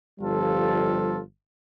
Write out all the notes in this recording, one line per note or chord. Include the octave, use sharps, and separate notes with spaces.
G1 F3 G3 F4 A4